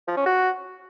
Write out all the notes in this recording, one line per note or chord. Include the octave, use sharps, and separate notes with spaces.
F3
C#4
F#4